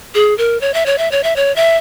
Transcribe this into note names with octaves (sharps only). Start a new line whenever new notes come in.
G#4
A#4
C#5
E5
C#5
E5
C#5
E5
C#5
E5